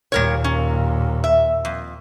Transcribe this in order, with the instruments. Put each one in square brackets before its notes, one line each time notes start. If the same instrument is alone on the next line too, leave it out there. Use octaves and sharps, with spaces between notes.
[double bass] D#2 A#2 [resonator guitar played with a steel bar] G3 A#4 C#5
[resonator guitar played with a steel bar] C#4
E5
F2